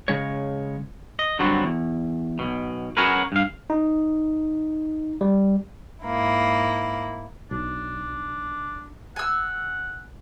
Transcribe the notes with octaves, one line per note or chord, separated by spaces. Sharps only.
C#3 G#3 C#5
D#5
G2 D3 F#3 B3 C4 F#4
E2
B1 F#2 B2
F#3 C#4 F#4 G#4 A#4 B4
G2 F5
D#4
G3
G#2 A#3 E4
B1 D4
F#5 G#5 E6